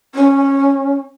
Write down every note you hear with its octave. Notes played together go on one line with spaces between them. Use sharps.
C#4